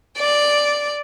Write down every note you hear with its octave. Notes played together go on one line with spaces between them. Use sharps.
D5